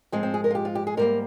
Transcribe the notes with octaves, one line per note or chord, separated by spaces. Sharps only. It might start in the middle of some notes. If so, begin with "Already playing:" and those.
G#2 F3 G#3 C4
C4
G#4
A#4
F4
G4
F4
G4
G#4
G#2 G3 A#3 A#4